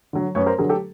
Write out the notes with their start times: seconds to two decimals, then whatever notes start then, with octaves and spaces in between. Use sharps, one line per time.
0.13 D3 F#3
0.35 F#2 B4 C#5
0.46 A#4 C5
0.58 D3 F#3 G#4 A#4
0.69 G4 A4